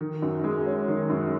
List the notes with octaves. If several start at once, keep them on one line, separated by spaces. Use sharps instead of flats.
D#3
F#2
G#3
C#4
D#3
F#2